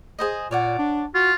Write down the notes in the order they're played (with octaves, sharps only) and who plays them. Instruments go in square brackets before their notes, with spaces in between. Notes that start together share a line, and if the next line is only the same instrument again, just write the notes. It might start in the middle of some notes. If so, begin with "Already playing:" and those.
[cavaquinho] G#4 C5 D#5
[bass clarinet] A#2 [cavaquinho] C#5 D5 F#5
[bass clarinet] D4
[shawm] F4 [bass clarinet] F#4